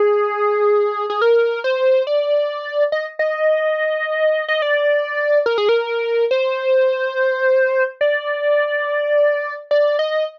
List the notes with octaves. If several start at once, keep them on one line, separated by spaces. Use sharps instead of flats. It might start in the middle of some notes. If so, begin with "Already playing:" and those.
Already playing: G#4
G#4
A#4
C5
D5
D#5
D#5
D#5
D5
A#4
G#4
A#4
C5
D5
D5
D#5